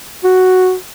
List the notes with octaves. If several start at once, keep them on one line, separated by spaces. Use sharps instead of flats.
F#4